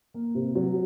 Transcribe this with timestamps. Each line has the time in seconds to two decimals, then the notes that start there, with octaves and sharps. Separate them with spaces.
0.14 A#3
0.34 C3
0.55 F#3